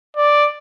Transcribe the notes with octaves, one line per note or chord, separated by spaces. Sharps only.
D5